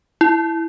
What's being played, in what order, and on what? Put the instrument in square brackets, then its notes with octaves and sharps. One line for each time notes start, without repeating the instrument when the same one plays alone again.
[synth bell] E4